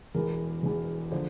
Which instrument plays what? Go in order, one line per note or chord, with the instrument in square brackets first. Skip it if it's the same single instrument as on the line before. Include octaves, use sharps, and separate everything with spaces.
[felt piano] E1 E2 E3 A#4
E1 E2 E3
D3 F3 C5